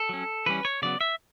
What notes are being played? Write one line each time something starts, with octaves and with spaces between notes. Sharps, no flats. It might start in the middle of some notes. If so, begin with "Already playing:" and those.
Already playing: A4
F#3 C#4
E3 G3 C#4 B4
C#5
C#3 F#3 B3 D5
E5